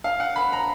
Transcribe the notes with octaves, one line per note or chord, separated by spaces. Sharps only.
F5
F#5
B5
A#5